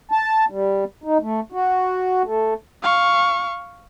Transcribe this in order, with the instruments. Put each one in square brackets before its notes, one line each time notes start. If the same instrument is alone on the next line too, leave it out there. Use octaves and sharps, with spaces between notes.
[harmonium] A5
G3
D#4
A3
F#4
A3
[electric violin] F5 C#6